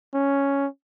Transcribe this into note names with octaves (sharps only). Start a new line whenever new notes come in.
C#4